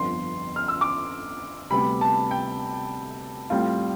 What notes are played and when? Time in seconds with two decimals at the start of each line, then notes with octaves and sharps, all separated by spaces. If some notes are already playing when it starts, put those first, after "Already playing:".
Already playing: G1 F2 D3 F3 B3 C6
0.56 F6
0.68 E6
0.81 D6
1.70 D2 C3 G3 B3 B5
2.01 A5
2.31 G5
3.50 A2 G3 C4 F4